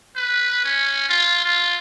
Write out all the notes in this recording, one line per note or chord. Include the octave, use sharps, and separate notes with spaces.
B4
C#4
F4
F4